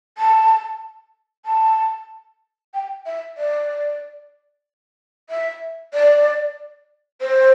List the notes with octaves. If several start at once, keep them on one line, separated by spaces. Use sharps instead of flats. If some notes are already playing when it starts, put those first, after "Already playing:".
A5
A5
G5
E5
D5
E5
D5
C5